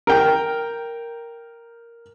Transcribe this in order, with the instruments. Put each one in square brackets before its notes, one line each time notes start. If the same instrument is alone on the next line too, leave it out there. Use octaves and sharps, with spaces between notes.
[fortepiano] A#4 G5